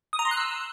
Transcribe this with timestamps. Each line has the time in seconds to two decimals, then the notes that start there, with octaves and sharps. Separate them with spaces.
0.13 D#6
0.19 A#5
0.25 C6
0.31 F#6
0.37 E6